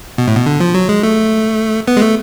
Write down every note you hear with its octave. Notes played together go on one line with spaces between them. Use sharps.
B2
A2
B2
D3
F3
F#3
G#3
A3
B3
G#3
A3